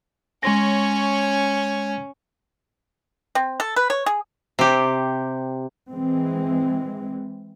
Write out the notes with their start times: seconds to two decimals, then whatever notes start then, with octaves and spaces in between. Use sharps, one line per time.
0.43 G#3 C#4 C#5 C6 A#6
3.35 C4
3.60 A4
3.76 B4
3.90 C#5
4.06 G#4
4.59 C3 G4
5.90 E3 G#3 C4